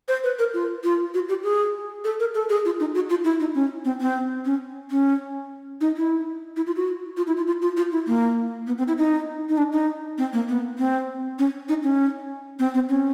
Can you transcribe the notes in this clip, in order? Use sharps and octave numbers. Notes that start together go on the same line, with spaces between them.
C5
B4
A#4
F4
F4
F#4
G4
G#4
A4
A#4
A4
G#4
F4
D#4
F#4
F4
E4
D#4
C#4
C4
C4
C#4
C#4
D#4
E4
E4
F4
F#4
F4
E4
F4
F4
F4
F4
E4
A#3
B3
C4
E4
D#4
D#4
D4
D#4
C4
A#3
B3
C4
C#4
D#4
C#4
C4
C4
C#4